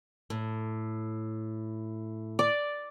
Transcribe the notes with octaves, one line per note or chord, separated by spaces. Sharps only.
A2
D5